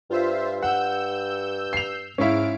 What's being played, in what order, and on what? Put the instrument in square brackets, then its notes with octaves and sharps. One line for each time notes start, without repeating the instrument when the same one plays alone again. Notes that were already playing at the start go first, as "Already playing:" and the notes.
[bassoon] G2 [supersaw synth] F4 C5 E5
[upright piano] F#5 [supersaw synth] E6 G6
[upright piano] C7 F7
[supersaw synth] G#2 F5 D7 [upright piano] C#4 E4